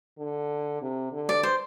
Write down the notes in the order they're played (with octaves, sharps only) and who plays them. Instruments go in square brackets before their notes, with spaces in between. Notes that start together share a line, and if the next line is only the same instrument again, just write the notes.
[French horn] D3
C3
D3
[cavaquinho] D5
C5